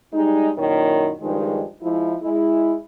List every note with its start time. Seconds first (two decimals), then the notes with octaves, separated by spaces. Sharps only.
0.13 G3 G#3 D#4
0.58 F#2 A#2 D#3 E4 C#5
1.22 G2 D#3 F3 G#3
1.81 F3 G#3 E4
2.21 G#3 E4